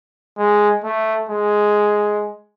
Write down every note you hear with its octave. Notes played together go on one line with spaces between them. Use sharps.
G#3
A3
G#3